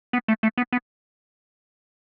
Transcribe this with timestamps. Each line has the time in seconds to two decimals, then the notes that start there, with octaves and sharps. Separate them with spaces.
0.13 B3
0.28 A3
0.43 A3
0.58 B3
0.73 B3